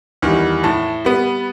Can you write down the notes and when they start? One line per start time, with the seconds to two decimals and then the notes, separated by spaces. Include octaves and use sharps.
0.22 E2 D#3 G3
0.64 A2 A5
1.05 G3 B3